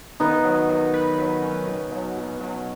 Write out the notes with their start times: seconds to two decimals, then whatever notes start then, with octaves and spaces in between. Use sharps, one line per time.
0.20 D#3 B3 D#4
0.45 F#3
0.69 F#3
0.94 B4
1.18 F#3
1.42 C#4
1.67 B2
1.92 F#3
2.17 B2
2.41 F#3